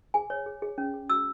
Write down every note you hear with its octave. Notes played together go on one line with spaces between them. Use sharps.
G#4 G#5
C#5
G#4
G#4
C#4
G#4
F#4 E6